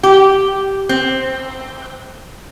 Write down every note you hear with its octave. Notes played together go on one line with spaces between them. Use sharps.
G4
C4